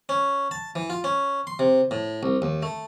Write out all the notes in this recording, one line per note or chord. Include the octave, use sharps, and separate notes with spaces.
C#4
A5
E3
F4
C#4
C6
C3
A2
C2
D#2
A3